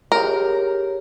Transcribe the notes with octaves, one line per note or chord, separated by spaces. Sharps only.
G4 G#4 A#4 C#5